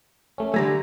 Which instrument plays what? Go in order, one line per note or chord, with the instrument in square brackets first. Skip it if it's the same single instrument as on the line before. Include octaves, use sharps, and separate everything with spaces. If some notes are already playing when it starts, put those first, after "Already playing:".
[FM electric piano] A3 C#4
[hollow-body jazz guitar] D3 G3 A3 [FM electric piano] G#5 A#5